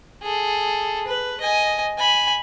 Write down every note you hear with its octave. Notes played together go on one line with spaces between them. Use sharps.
G#4 A4
B4
D#5 G#5
G#5 B5